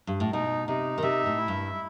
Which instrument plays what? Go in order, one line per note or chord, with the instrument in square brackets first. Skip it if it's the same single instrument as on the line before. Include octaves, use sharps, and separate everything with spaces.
[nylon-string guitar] G2
A2
[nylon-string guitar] B2 [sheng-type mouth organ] D#4
[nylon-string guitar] C3 [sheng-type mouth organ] D#4
[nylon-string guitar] D#3
[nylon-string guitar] C3 [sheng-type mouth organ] E5
[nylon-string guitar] A2
[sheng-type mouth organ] E4
[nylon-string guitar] G2
[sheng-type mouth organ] E4